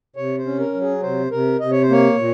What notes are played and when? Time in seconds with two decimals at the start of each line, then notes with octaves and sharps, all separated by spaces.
0.16 C3 C#5
0.38 C5
0.45 C#4
0.59 A#4
0.74 F#3
0.81 G#4
1.03 C3 C5
1.31 C3 A#4
1.60 C3 D#5
1.71 C#5
1.82 C5
1.90 A#3 C#5
2.18 A#2